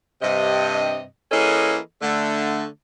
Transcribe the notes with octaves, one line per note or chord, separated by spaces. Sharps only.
G2 C3 D#5
E3 A#3 C#4 G#4 A4 D#5
D3 A3